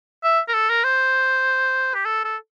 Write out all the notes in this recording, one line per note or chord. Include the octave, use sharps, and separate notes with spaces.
E5
A#4
A4
A#4
C5
G4
A4
A4